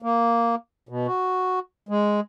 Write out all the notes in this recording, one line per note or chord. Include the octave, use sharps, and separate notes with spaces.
A#3
B2
F#4
G#3